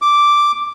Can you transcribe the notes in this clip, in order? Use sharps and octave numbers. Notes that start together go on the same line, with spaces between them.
D6